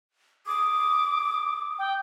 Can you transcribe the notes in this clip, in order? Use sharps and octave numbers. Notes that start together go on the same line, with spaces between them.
D6 D#6
G5